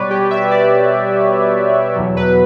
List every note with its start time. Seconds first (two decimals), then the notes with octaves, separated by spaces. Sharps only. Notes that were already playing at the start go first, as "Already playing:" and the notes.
Already playing: B2 G3 B4 C#5 D5
0.10 G4
0.31 E5
0.51 D5
1.95 E2 B2 F#3
2.17 B4